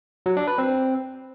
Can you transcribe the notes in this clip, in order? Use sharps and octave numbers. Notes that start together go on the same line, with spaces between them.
F#3
D4
B4
C4